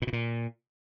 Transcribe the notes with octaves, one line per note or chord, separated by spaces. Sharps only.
A#2
B2
A#2